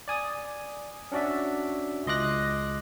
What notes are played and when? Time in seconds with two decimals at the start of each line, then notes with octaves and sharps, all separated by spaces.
0.08 D5 G#5 D#6
1.12 C#4 D4 F#4 D5 E5
2.07 C#2 D#5 C6 D6 F#6 A#6